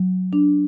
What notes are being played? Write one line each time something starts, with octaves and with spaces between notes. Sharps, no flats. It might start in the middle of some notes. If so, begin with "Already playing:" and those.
Already playing: F#3
D4